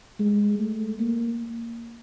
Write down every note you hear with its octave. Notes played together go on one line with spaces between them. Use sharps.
G#3
A3
A#3